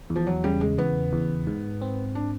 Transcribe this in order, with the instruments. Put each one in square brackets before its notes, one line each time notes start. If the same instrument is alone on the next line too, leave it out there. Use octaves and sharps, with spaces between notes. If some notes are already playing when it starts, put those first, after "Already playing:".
[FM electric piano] E2
[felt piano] F3
F#3
[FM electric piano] C#3 [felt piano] G3
[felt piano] G#3
[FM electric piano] E2 [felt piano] B3
[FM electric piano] E2
G#2
C4
[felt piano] D4